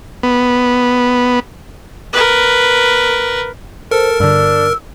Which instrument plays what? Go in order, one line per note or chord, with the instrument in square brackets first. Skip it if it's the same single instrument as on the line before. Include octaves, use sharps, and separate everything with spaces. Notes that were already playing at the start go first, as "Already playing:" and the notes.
[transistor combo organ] B3
[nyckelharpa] A#4 B4
[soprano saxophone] A4 [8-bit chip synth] A#4 [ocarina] C5
[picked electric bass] G2 D3 [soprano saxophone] D4 [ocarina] E6